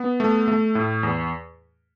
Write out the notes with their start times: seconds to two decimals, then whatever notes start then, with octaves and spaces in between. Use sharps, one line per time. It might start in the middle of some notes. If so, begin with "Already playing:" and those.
Already playing: B3
0.20 A3
0.48 A3
0.75 A2
1.03 E2